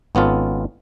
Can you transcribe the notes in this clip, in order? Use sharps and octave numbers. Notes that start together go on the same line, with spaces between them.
G#1 B3 C#4 F4 A4